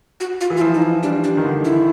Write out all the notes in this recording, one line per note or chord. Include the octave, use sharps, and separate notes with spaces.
F#4
F4
E3
F4
F3 E4
D#4
E4
G3 D4
D4
D#3
D3
E4